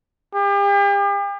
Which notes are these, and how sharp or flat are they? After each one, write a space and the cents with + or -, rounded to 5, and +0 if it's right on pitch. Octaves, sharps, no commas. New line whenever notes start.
G4 +40